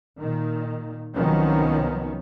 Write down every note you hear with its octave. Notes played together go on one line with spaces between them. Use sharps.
A#2 D#3
C2 D#3 F3 F#3 B3 C#4